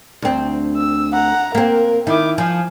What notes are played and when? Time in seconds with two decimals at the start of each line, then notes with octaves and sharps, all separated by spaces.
0.22 D2 C4
0.77 E6
1.13 F#5 A#5
1.55 A#3 C4 A#4
2.07 D#3 E4 D6
2.38 F3 G#5